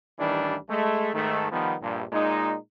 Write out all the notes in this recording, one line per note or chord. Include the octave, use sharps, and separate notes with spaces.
A1 D#3 E3 G3 D4
G#3 A3
G#2 D#3 A3
D#3 F3 G3 B3
A#1 G2
A#2 G#3 D#4